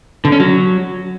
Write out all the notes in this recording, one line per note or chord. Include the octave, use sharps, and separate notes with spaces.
D3
C#4
F#3